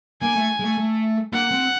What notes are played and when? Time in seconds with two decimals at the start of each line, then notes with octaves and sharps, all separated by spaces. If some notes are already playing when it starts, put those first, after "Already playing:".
0.22 A#3 G#5
0.36 A3
0.60 G#3
0.64 A3
0.78 A3
1.33 A#3 F#5
1.51 C4